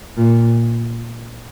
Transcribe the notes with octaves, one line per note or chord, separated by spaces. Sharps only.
A#2